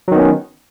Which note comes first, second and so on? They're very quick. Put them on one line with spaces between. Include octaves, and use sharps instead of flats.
F#3 D#3 B3 C#4